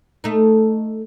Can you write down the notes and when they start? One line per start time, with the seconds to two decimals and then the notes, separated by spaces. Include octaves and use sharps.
0.24 A3 D#4